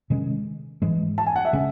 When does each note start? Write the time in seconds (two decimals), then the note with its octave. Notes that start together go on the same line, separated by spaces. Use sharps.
0.10 C3 D#3 G#3 C#4
0.82 G#2 E3 G#3
1.18 A5
1.27 G#5
1.36 F#5
1.45 E5
1.53 C#3 G#3 C#4